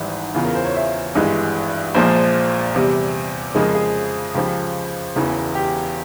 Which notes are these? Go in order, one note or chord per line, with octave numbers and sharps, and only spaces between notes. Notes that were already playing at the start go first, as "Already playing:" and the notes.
Already playing: G#1 G#2 E3 G3 E4
E1 E2 C#3 E3 F4
A#4
C5
C#5
E5
G#1 G2 E3 G#3
A#1 A#2 F3 G#3 C5
E2 C3 G3
F2 C#3 F3 G#3 A#4
G#4
C#2 C#3 F3 G4
E1 E2 C#3 E3
G4